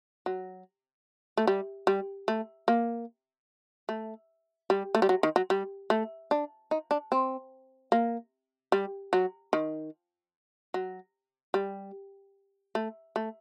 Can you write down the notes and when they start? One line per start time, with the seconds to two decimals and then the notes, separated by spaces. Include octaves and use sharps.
0.26 F#3
1.37 A3
1.47 G3
1.87 G3
2.28 A3
2.68 A#3
3.89 A3
4.70 G3
4.95 A3
5.02 G3
5.09 F#3
5.23 D#3
5.36 F#3
5.50 G3
5.90 A3
6.31 D4
6.71 D#4
6.91 D4
7.12 C4
7.92 A#3
8.72 G3
9.13 F#3
9.53 D#3
10.74 F#3
11.54 G3
12.75 A3
13.16 A3